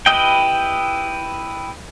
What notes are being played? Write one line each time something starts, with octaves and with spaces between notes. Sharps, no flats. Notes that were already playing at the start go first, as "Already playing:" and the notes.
E4 G4 B4 D#5 G5